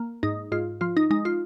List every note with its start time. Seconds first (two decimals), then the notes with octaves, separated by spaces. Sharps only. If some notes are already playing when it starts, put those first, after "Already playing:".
Already playing: A#3
0.23 G#2 D#4
0.52 G#2 F4
0.81 F3 F4
0.97 D#4
1.11 G#3 D#4
1.25 F4